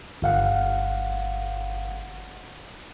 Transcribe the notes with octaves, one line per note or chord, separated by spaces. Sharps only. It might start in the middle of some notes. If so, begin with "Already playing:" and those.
G1 F5 F#5